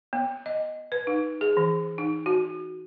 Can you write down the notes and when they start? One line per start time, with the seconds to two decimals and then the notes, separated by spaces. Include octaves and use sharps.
0.13 B3
0.46 D#5
0.92 B4
1.07 D#4
1.41 G#4
1.57 E3
1.98 D#4
2.26 F#4